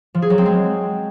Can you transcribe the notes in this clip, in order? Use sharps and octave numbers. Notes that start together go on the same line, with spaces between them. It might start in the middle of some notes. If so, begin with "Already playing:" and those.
F3
G#4
F#3
C4
G#3